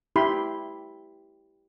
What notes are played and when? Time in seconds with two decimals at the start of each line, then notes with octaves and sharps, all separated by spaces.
0.16 E4 G4 B5 C6